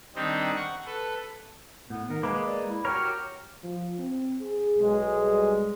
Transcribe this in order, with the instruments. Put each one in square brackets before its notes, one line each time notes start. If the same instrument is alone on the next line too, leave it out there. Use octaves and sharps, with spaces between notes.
[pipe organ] D#3 G3 C4 D4 D#4
F#5 C#6
A4 B4
[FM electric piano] A2 [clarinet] B3
[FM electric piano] D#3 [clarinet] A#4
[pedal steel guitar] G#3 A#3 [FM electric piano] B4 [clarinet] D6
[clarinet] D5
E4
[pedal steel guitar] F#4 G4 A#4 [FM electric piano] C#5 [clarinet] F6
[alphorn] F3
C4
G#4
[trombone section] B1 G#3
[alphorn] G3